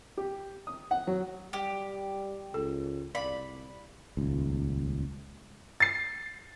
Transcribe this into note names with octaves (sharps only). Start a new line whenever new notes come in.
G4
D#6
F#5
F#3
G3 G4
C#2 A4
C2 D5 F5 B5
D#1 C#2
A6 C7